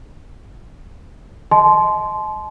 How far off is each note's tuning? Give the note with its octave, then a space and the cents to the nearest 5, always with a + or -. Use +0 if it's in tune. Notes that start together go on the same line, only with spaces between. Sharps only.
D#5 +15 A5 -40 C6 -5